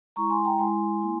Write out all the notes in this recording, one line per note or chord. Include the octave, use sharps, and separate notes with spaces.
G#3 E4 A#5 C#6
G#5 C6
G5 A#5
G#3 E4 G#5 C6
A#3 E4